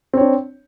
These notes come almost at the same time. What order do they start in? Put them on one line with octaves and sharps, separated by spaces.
C4 C#5 D4